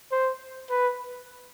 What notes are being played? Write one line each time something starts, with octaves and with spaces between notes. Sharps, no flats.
C5
B4